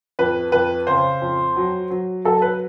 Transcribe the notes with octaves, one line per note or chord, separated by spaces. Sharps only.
F2 B4
F2 B4
C#3 C5
F2
F#3
F#3
F#3 A4
B4